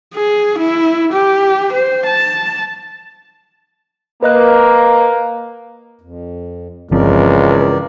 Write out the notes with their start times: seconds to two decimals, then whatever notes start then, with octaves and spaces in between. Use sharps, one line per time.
0.15 G#4
0.58 E4
1.13 G4
1.73 C5
2.06 A5
4.23 A#3 B4 D#5 F#6
6.01 F2
6.91 G1 C#2 E3 F3 C4 A#4 D5